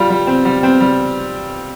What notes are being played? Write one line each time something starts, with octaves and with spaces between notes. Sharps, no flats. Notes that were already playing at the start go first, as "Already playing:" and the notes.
Already playing: G3 F4
G3
C4
G3
C4
G3